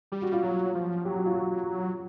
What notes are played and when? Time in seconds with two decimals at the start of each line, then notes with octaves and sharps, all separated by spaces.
0.12 G3 G4
0.22 F#4
0.33 F4
0.42 F#3 F#4
0.75 F3
1.05 F#3 G4
1.16 F#4
1.26 F4
1.35 F#4